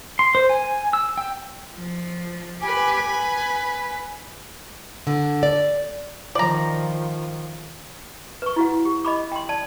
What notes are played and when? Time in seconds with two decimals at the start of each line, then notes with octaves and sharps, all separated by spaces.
0.19 C6
0.35 C5
0.49 G#5
0.93 E6
1.18 G5
1.74 F3
2.62 G4 B4 G#5
3.09 B4
5.07 D3
5.43 D5
6.35 D#3 F3 D5 A#5
8.42 B4 C#6
8.56 E4 F#4 F#5
8.85 G4
9.05 D#5 B5 D6
9.32 G5 C6
9.49 D5 A5